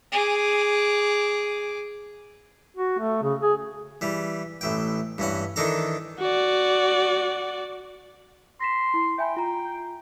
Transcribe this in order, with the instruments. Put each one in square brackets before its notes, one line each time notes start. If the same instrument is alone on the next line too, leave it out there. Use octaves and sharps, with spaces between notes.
[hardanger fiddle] G#4 D6
[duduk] F#4
A3
C#3
G#4
[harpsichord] E3 G3
A1 E3 G5
G2 E3 C#4 F#5
D#3 E3 D4 A4 A#5
[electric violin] F#4 D5
[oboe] C6 [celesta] A#6 B6 E7
[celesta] E4
[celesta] E5 G#5 B5 [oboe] G5
[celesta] F4 A#5